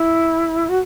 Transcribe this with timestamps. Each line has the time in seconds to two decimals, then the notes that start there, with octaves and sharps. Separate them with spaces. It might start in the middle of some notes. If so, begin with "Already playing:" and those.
Already playing: E4
0.69 F#4